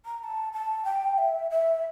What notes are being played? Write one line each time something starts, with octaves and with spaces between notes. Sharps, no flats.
A#5
A#5
A5
A5
G5
E5
E5